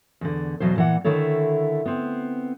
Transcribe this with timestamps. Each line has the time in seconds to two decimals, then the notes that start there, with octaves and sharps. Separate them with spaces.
0.21 E2 D3
0.60 E2 B2 F#3 C5
0.76 A#2 E3 F#5
1.04 D3 D#3 E4 A4 C#5
1.85 B3 C4